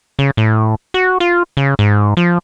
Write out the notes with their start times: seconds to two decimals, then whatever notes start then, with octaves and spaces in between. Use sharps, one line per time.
0.19 C#3
0.37 A2
0.94 F#4
1.20 F4
1.57 C#3
1.79 G#2
2.17 F3